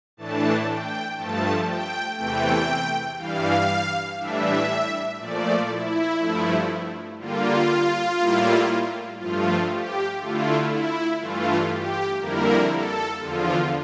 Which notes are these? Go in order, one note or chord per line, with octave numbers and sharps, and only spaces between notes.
A2 E3 A3 D4 A5
G5
G2 F3 A3 A5
G5
E2 C3 E3 A3 G5
G2 E3 G3 F5
A2 E3 G3 D4 E5
A#2 F3 A3 D5
E4
G2 F3 A3 E4
D3 G3 A#3 F4
A2 G3 A#3 E4
G2 F3 A3 F4
G4
D3 A3 E4 F4
E4
G2 E3 A3 F4
G4
F2 D3 G3 A#3 E4 A#4
A4
E2 D3 F3 F4